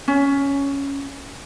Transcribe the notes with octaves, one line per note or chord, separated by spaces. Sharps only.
C#4